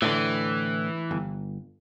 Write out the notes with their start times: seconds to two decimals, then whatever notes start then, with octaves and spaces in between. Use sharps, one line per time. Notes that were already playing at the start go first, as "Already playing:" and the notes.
0.02 A2 D3 E3
1.11 G1